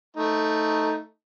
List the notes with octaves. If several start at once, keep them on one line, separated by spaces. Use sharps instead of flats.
A3 D#4